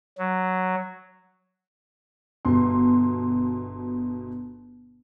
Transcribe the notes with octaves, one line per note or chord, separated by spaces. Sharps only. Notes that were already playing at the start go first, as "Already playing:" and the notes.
F#3
G1 B2 C6